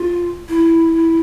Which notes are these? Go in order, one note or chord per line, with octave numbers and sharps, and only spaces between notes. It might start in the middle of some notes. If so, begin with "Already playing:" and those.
Already playing: F4
E4